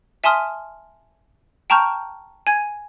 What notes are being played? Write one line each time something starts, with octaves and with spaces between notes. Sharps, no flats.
E5 G#5 A5 C6 D#6 F6
G5 A5 A#5 C#6 F6 G6
G#5 G#6